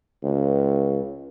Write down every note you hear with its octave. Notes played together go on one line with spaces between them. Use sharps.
C#2